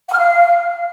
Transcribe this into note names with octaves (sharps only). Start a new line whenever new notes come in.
F#5
F6
F5